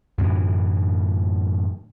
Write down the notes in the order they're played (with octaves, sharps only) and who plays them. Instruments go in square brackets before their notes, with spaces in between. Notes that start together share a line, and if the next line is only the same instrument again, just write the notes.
[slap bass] F#2 A2 D3 E3